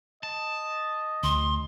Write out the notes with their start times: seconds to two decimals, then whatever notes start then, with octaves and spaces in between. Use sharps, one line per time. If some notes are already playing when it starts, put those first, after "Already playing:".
0.23 D#5 A5
1.23 D2 C6